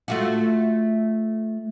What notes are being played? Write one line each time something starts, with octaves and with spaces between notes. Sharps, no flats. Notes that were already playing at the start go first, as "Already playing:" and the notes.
A3 F4 F#4